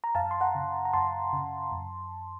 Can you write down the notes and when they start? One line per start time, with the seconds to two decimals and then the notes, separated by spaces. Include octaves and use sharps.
0.04 A#5
0.15 F#2 F5 A5
0.31 C6
0.41 F#5 A#5
0.55 C#3
0.85 A#5
0.93 F#2 A5 C6
1.33 C#3
1.72 F#2